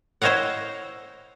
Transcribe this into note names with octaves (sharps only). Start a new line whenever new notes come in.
E4 C5 C#5 D#5 F5 F#5